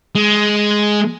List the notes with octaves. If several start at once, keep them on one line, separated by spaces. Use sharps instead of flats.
G#3